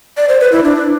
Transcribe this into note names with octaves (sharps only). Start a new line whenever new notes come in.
D5
C5
B4
E4
D4